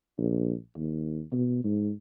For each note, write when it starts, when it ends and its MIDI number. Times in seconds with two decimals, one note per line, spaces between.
0.18 0.53 34
0.76 1.22 39
1.32 1.62 47
1.64 1.90 44